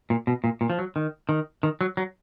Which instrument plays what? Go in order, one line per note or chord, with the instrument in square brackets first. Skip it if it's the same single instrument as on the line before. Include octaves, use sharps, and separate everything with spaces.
[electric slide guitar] A#2
B2
A#2
A#2
F3
F#3
D#3
D#3
D#3
F#3
F#3